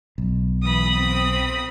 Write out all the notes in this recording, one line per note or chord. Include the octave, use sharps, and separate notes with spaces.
B1
E3 B5 D#6
C4